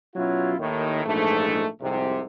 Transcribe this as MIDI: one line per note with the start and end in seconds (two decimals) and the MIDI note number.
0.16 0.55 47
0.16 0.55 54
0.16 0.55 61
0.16 0.55 64
0.16 0.55 65
0.59 1.03 39
0.59 1.03 45
0.59 1.03 51
1.06 1.66 34
1.06 1.66 44
1.06 1.66 52
1.06 1.66 57
1.81 2.23 36
1.81 2.23 41
1.81 2.23 44
1.81 2.23 48